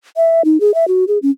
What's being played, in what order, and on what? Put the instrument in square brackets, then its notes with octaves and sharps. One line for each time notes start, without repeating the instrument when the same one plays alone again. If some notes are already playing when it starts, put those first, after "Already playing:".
[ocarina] E5
D#4
G#4
E5
F#4
G#4
C#4